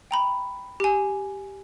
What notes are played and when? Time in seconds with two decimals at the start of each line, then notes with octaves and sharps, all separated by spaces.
0.11 G5 A#5 B5
0.80 G4 G#5